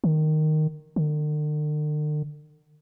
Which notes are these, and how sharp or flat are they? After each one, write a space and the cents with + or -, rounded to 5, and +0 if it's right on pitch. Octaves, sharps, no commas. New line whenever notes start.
D#3 -10
D3 +45